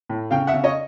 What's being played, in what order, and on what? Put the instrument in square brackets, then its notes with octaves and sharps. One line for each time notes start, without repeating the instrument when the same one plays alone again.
[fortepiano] A2
C#3 F5 G5
E5 F#5
C#3
C#5 D#5